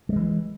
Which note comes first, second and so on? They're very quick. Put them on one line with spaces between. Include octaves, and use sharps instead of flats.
G3 G#3 E3